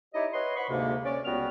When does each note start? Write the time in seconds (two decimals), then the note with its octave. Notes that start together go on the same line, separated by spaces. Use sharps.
0.13 D#4 E4 G4 C#5 D#5
0.33 B4 C#5 D#5 F#5 C6
0.56 C5 F#5 B5 C#6
0.69 D2 G#2 C3 A#3
1.05 C#4 C#5 D5
1.25 C#2 G3 B3 F#4 F6